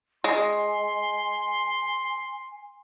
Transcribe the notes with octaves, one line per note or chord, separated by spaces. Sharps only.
G#3 G#5 C6